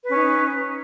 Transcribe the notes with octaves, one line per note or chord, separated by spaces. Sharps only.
C#4 D#4 B4